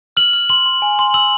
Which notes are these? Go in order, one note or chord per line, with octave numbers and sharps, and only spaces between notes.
F6 F#7
F6
C6 F#7
C6
G#5
C6
E6 F#7